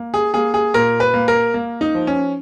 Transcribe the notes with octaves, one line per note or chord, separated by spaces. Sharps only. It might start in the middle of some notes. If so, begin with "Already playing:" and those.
Already playing: A#3
G#4
A#3 G#4
G#4
A#2 A#4
B4
A#3
A#4
A#3
D#4
F3
C#4